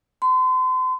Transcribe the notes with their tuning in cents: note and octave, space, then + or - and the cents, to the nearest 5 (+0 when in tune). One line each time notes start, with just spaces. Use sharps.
C6 -40